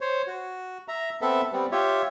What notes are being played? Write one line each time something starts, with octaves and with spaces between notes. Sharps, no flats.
C5 C#5
F#4
E5 A#5
B3 C4 A4 E5
G3 B3 C4
F4 G4 C#5 E5